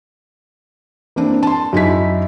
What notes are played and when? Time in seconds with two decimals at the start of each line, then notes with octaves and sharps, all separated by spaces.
1.16 E3 A#3 C4 D4
1.43 A5 C6
1.73 F#2 D#4 E4 B6